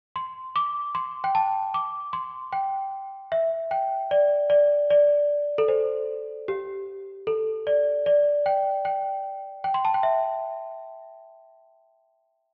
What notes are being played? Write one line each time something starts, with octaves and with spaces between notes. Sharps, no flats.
C6
D6
C6
G5
A5
D6
C6
G5
E5
G5
D5
D5
D5
A4
C5
G4
A4
D5
D5
G5
G5
G5
C6
A5
G5
E5